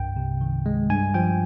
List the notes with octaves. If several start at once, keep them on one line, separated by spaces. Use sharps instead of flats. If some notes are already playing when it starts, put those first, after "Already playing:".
Already playing: C2 G2 G5
C3
D#3
G#3
G2 G#5
F3 G5